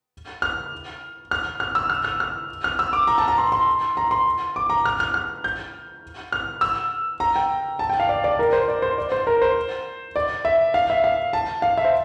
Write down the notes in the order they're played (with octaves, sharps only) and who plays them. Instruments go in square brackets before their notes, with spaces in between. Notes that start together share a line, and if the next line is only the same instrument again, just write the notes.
[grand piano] F6
F6
F6
E6
F6
F6
F6
F6
E6
D6
A#5
A5
A#5
C6
C6
A#5
C6
D6
A#5
F6
F6
F6
G6
F6
E6
A#5
G5
A5
G5
F5
D5
D5
A#4
C5
D5
C5
D5
C5
A#4
C5
D5
E5
F5
E5
F5
A5
F5
E5
C5